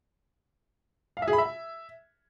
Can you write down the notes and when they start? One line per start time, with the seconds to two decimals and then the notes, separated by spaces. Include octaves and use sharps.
1.17 F5
1.22 E5
1.28 G#4
1.33 B5
1.38 E5